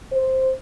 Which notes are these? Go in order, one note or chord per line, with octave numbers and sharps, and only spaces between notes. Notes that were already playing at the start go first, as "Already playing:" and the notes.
C5